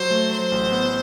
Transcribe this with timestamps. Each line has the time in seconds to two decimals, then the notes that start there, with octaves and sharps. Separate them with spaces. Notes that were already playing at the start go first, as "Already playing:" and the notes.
Already playing: F#3 F#4 C5
0.11 A3
0.31 F#3 C5
0.52 A1
0.72 B3